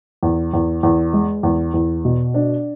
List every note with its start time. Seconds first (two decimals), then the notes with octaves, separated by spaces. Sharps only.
0.23 E2
0.53 E2
0.83 E2
1.13 G#3
1.43 E2
1.74 E2
2.05 B2
2.34 D4